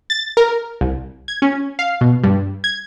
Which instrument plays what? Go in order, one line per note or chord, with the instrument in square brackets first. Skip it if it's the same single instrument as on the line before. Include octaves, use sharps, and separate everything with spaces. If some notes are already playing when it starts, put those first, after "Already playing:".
[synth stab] A6
A#4
C2
G#6
C#4
F5
B2
G2
G#6